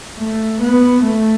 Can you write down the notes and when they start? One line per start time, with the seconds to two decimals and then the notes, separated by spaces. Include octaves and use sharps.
0.17 A3
0.60 B3
1.03 A3